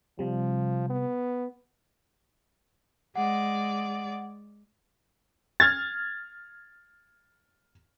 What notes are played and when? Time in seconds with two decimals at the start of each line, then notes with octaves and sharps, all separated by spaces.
0.19 C3 F3 G3
0.90 B3
3.15 G#3 D5 F#5
5.60 F6 G#6 A6